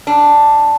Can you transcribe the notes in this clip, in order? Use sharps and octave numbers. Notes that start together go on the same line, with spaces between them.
D4